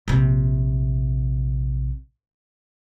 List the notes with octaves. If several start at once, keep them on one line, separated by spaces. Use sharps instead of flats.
A#1 C3